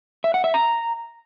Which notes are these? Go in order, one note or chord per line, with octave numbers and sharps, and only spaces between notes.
E5
F#5
E5
A#5